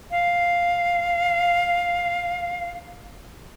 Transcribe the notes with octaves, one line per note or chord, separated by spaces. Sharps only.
F5